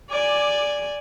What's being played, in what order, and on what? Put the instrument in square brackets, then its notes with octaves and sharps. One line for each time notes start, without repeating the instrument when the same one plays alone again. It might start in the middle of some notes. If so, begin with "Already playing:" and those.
[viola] D5 G#5 [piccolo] D6